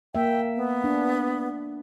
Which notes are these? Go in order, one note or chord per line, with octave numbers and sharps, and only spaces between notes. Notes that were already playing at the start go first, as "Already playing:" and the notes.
A#3 E5 G5
B3
D4